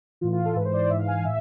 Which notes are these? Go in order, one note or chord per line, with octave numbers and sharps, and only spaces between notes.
A2 E3 F4
F4
A4
G#2 E3 B4
C5
D5
C5
G#2 E3 E5
F5
G#5
F5
A2 E5